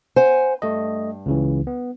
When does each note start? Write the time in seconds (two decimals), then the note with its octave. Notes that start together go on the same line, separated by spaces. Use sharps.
0.16 C5 F#5 G#5
0.62 G2 A3 D#5
1.26 C#2 C#3 E3
1.67 B3